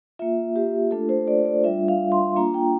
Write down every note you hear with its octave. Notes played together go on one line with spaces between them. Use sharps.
A#3 F4 E5
G4
A3 D4 F4 A4
C5
D5
D5
G3 D4 F4 E5
F5
C6
A#3 D4 F4 A#5
G5